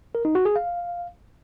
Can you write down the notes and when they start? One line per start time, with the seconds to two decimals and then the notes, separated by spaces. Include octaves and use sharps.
0.15 A#4
0.25 D#4
0.35 F#4
0.45 G#4
0.56 F5